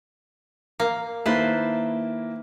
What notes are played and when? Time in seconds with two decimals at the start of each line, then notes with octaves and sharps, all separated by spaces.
0.80 A#3
1.26 D#3 A#3 E4 B4 C5 A5